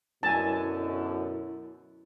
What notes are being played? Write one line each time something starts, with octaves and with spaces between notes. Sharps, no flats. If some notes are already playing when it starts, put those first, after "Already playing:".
F#2 B2 D3 E4 G#5 A5